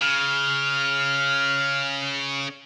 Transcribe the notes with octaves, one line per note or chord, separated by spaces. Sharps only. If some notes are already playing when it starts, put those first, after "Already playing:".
C#3 F6